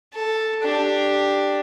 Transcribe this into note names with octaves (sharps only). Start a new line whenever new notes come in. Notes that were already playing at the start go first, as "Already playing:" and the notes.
A4
D4 G4